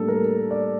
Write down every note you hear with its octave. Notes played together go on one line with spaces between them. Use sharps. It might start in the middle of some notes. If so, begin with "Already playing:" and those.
Already playing: A2 G3 A#3 D4 A4
A#4
D5